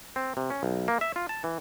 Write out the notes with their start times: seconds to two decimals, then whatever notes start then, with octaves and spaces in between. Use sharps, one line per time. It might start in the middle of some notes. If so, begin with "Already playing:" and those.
0.16 C4
0.37 C3
0.50 C#4
0.63 B1
0.88 A#3
1.01 E5
1.16 F4
1.29 A5
1.44 E3